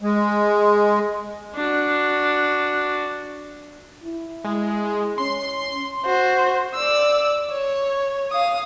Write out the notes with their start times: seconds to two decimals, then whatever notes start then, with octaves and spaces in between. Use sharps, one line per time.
0.02 G#3
1.55 D4 F#4
4.03 E4
4.44 G#3
5.18 C#4 C6
6.05 F#4 C5
6.74 D5 E6
7.51 C#5
8.32 F5 D#6